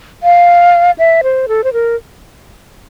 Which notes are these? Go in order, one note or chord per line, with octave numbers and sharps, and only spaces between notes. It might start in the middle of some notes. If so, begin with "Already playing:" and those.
F5
E5
C5
A4
C5
A#4